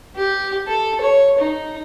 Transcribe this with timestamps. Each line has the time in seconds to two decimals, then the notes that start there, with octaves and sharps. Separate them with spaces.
0.16 G4
0.67 A4
1.01 C#5
1.38 D#4